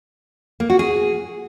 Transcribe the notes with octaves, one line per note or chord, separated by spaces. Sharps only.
A#3
F#4
G#4